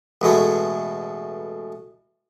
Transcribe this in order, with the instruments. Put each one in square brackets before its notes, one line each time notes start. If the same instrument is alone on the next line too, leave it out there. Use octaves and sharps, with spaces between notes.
[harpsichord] A1 B2 G#3 A3